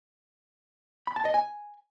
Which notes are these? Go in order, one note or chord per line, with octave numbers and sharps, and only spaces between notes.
B5
A5
D#5
G#5